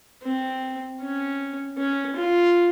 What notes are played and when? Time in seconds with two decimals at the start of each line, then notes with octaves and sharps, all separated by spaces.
0.23 C4
1.01 C#4
1.78 C#4
2.16 F4